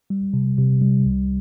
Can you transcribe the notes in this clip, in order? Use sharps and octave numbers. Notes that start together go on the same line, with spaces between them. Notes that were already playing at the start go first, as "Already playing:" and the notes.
G3
C3
C3
G3
C2